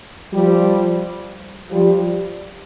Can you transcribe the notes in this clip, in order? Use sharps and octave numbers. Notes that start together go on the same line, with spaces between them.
F3 G3
F3 G3